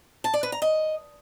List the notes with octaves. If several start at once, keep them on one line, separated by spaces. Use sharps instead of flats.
A5
D5
B4
A#5
D#5